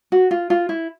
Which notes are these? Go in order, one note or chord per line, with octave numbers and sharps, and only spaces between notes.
F#4
F4
F4
E4